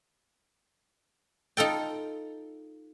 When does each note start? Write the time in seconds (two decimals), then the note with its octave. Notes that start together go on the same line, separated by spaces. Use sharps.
1.57 D#4 F4 A4 G5